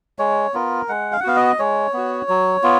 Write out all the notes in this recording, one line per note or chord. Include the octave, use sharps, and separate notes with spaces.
G#3 C#5
B3 F4 A#4
G#3 F#5
F5
F#5
B3 F#4 F5
D#5
G#3 C#5
B3 F#4
F#3
B3 F4